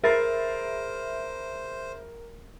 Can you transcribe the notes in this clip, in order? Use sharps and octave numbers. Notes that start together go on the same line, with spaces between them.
G#4 A#4 C5 E5 B5 A6 C7